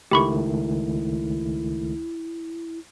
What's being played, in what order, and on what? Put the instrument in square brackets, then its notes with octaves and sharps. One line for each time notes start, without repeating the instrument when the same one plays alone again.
[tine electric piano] C#2 D#3 A3 [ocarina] E4 [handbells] G4 B5 C#6